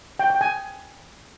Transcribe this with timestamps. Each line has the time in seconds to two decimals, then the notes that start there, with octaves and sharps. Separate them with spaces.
0.19 G5
0.30 G5
0.41 G#5